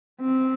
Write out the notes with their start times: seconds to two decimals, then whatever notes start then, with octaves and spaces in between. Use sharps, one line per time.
0.21 C4